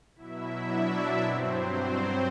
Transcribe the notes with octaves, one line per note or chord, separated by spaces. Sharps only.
B2 F#3 E4 E5
D4 D5
G2 F#3 C4 C5